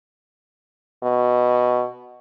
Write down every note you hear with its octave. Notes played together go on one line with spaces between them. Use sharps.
B2